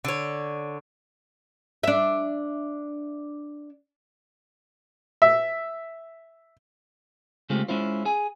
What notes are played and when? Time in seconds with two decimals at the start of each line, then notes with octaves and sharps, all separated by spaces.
0.05 D3 C#5
1.83 D4 E5
5.22 E5
7.50 C#3 G#3 A3 C4 F4 G4
7.68 G#3 C#4 E4 F4 C5
8.05 G#4 G#5